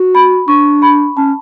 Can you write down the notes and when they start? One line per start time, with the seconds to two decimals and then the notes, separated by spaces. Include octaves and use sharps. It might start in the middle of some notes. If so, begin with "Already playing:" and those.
Already playing: F#4
0.15 B5
0.48 D4 C#6
0.82 B5
1.17 C#4 A5